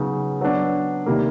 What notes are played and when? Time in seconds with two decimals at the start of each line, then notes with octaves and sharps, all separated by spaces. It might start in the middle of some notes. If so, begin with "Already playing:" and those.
Already playing: C#3 F#3 B3 D#4
0.41 F#3 B3 D4
1.06 C3 D#3 G3 A#3